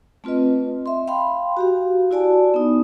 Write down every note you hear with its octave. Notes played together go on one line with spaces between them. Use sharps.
A3 C4 F4 B4 D#5
E5 C6
F5 G5 B5 C6
F#4 G4 F5
E4 F#4 D5 G#5 A5
B3 D#4